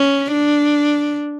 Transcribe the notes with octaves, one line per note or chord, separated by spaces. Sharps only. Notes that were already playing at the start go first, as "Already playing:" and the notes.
Already playing: C#4
D4